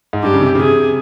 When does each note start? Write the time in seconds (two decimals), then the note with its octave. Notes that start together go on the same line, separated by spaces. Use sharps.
0.13 G#2
0.23 G2 G4
0.33 C#3
0.41 C3
0.55 C#3
0.60 C3 G#4